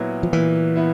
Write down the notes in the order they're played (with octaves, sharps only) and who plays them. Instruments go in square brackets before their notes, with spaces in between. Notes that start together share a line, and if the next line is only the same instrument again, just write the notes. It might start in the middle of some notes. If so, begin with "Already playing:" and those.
Already playing: [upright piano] A#2 F#3 B3 E4
[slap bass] F3
[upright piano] A#2 [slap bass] E3
[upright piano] B3 E4